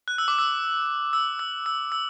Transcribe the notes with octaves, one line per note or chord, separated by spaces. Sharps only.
F#6
E6
D6
E6
E6
E6
E6
E6